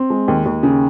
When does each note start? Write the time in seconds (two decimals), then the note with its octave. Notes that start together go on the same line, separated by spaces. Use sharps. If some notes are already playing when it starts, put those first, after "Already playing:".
Already playing: C4
0.10 G#3
0.28 D#2
0.46 D#2
0.63 C#3